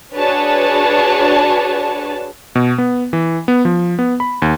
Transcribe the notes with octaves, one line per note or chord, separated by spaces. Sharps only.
D4 F#4 G#4 B4 C#5 A5
B2
B3
E3
B3
F3
B3
B5
D#2